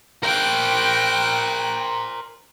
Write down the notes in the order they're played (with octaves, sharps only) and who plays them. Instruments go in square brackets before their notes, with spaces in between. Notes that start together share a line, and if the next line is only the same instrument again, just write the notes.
[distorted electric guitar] A#4 C5 [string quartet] G5 F#6